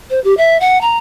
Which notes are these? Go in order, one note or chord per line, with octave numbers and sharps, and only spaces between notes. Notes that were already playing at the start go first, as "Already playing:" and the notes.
C5
G4
E5
F#5
A#5